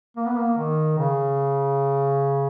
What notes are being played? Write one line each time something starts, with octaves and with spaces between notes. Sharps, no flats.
A#3
B3
A#3
D#3
C#3